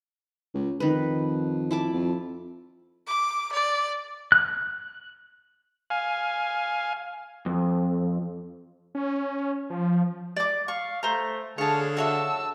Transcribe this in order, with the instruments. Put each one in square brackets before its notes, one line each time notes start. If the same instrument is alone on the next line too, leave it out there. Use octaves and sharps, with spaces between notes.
[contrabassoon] C#2
[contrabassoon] F2 [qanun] D#3 B4
[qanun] E4 A5 D6
[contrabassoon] F2
[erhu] D6
D5
[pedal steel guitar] F#6
[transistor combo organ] F5 G#5
[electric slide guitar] F2
[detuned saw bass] C#4
F3
[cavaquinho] D5 D6
[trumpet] F5 [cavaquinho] C#6
[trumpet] A3 [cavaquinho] C5 A#5
[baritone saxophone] D3 [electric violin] G#4 [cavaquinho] C#5 A5 [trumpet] F5
[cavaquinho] F#4 C#5 E5 [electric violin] A5 E6